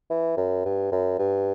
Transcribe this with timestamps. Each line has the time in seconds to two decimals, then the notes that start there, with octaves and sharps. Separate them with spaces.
0.10 E3
0.37 F#2
0.65 G2
0.92 F#2
1.19 G2